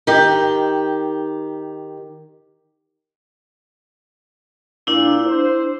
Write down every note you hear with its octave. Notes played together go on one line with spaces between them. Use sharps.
D#3 G4
A#2 D4 E4
C5